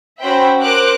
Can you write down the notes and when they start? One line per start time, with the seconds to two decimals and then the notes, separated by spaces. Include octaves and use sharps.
0.20 C#4 F#4 C5 E5 G5 B5
0.61 A#4 C5 D6 F#6